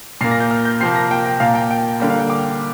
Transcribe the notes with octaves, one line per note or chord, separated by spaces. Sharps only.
A#2 A#3 C7
A#6
G6
F6
G6
C3 F3 A#3 C7
A#6
G5
G5
A#2 A#3 F5
G5
G5
D3 G3 A#3 G5
F5
G5
D6